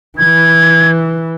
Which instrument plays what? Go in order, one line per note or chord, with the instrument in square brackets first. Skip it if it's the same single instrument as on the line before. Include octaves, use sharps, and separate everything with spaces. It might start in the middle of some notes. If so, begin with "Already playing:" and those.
[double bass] E3 [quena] G#6